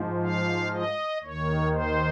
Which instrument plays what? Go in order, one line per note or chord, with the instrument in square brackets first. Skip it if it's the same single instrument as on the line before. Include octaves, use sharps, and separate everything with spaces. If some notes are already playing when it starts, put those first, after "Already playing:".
Already playing: [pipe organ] G#2 F3
F5
D#5
D#2 D#3 C#5
C5